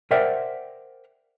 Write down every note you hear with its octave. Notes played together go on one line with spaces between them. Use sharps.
A#4 C5 D5 E5 F#5 G5